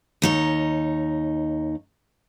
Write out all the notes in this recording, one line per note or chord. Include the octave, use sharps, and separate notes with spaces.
D#2 D#4 C#5